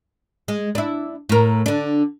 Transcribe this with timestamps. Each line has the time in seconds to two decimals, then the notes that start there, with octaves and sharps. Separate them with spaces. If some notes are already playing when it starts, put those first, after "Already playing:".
0.48 G#3
0.75 D4 E4
1.29 A2 A#4
1.66 D3 D4